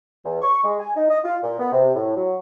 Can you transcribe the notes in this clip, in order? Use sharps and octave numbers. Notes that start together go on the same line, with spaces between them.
E2
C#6
G#3
G#5
D#4
D#5
F4
A#2
B3
C3
A2
F#3